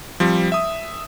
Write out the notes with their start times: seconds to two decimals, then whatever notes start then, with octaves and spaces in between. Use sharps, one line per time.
0.20 F3 G3 C4
0.52 E5 D#6